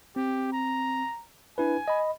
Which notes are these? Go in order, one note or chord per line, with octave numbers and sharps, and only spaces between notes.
C4 G4
A#5
D4 E4 B4 G#5
D#5 B5